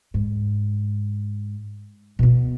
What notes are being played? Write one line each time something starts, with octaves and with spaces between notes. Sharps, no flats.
G#2
B2 B3